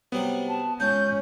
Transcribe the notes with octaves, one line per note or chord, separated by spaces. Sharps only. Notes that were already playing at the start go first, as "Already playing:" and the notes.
C3 F#3 G3 B3
A5
C#2 C#4 D#4 G6